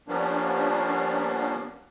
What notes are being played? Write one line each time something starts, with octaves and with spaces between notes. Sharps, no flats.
F3 G3 A#3 B3 C#4 D4